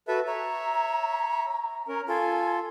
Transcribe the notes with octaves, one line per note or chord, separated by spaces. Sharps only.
F#4 A4 B4 E5
C#5 E5 A#5
C#4 A#4
F4 A4 G#5